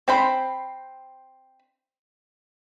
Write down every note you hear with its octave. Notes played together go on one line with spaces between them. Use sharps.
C4 C5 B5